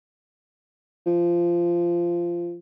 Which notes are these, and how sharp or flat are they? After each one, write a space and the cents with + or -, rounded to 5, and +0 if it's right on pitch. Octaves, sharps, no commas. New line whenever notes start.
F3 -15